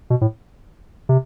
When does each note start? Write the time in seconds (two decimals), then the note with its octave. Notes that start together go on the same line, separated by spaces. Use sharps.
0.10 B2
0.21 A2
1.09 C3